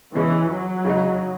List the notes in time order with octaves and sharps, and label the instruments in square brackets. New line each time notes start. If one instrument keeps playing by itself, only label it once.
[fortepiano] B2 G#3 C#4 [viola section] E3
[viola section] F#3
[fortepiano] C#3 G#3 D#4